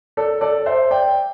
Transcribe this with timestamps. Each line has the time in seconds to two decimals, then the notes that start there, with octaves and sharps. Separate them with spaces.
0.17 A4 D5
0.41 A4 D5
0.66 C5 E5
0.91 D5 G5